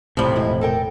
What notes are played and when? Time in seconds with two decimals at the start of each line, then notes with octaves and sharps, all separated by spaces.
0.17 E1 A2 C3 F3 G3
0.36 F2 G#2 E4
0.61 A4 A#4 G5